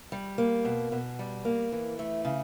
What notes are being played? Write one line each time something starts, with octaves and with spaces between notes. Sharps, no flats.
G3
A#3
B2
B2
G3
A#3
E3
A3
C#3